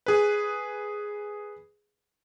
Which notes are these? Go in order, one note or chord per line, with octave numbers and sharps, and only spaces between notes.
G#4 B4